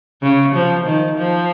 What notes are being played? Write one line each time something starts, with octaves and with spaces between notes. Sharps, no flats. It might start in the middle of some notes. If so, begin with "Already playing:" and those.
C#3
F3
D#3
F3